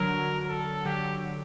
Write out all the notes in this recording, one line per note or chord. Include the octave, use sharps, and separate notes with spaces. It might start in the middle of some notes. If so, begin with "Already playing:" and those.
Already playing: D3 F#3 A#4
A4
D3 F#3 G4